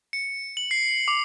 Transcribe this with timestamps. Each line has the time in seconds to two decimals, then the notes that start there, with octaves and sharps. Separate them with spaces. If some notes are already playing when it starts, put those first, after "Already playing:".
0.13 C#7
0.57 F#7
0.71 C7
1.08 D6